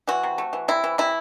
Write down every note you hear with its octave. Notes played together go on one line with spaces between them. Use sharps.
E3 F#4
C3
A3
E3
C3 E4
E3
C3 E4